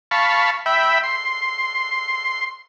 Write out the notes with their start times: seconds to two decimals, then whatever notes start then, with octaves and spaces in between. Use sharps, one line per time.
0.11 F5 A5 B5 C#6
0.66 E5 G5 B5
1.03 C6